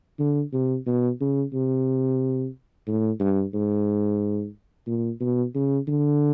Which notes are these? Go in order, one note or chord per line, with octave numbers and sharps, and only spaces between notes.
D3
C3
B2
C#3
C3
A2
G2
G#2
A#2
B2
C#3
D3